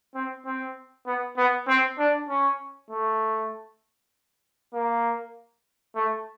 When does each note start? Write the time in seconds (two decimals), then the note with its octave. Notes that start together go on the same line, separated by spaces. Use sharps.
0.15 C4
0.46 C4
1.07 B3
1.37 B3
1.68 C4
1.99 D4
2.29 C#4
2.90 A3
4.74 A#3
5.96 A3